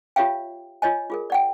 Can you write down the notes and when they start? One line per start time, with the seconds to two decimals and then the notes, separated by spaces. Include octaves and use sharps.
0.16 F4 G4 C#5 E5 F5 G5
0.82 F4 C#5 D#5 G#5
1.10 F4 G#4 A#4
1.30 D5 F#5 G5